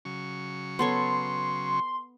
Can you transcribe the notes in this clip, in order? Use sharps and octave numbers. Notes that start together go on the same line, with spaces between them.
C#3 F#3 C#6
B3 A4 C#5 C6